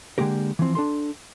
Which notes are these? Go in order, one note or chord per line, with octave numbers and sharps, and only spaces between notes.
D3 E3 G#3 A#3 G4 A#4
E3 F3 C4
D4 A4 C6